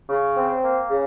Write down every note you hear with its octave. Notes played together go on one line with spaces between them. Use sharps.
C#3
C4
A#3
C#3